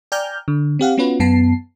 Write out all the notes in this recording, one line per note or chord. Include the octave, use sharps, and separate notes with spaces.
D5 G5 G#5 A#5 F6 G6
D3
C4 G4 F5 F#5
B3 C#4 F4 F#4 B4
F#2 B3 A5 C7